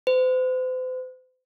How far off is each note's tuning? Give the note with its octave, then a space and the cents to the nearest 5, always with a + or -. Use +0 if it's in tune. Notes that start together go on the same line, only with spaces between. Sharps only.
C5 -40